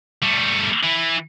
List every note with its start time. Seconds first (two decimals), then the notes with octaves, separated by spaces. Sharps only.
0.23 G3 A3
0.83 E3